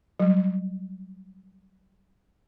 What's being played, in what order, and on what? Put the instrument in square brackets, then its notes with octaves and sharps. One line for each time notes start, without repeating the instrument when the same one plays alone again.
[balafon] F#3 G3